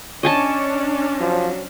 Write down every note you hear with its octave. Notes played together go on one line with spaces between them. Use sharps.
C#4 D4 C#5 D#5 G#5 A5
F3 F#3